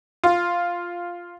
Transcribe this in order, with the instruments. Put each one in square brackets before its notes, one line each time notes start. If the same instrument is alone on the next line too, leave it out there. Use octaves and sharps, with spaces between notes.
[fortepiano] F4